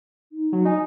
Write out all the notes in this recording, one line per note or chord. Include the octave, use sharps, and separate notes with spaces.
D#4
F#3
D#4 G#5